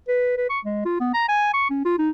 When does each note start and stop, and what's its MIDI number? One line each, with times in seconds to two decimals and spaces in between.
0.08 0.37 71
0.37 0.49 71
0.50 0.59 85
0.65 0.81 56
0.85 0.99 65
1.00 1.12 59
1.14 1.25 82
1.29 1.51 80
1.54 1.67 85
1.70 1.81 61
1.85 1.97 65
1.99 2.10 63